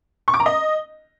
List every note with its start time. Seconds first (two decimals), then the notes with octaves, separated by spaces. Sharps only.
0.28 C#6
0.34 D6
0.40 A#5
0.46 D#5